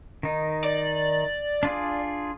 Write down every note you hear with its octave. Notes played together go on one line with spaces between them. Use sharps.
D#3 D#4
D5
D4 F4 G#4